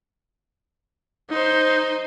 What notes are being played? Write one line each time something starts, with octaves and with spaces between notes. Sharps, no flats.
D#4 C5